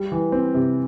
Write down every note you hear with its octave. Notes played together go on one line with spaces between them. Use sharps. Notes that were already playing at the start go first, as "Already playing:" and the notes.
Already playing: G3
E3
C4
C3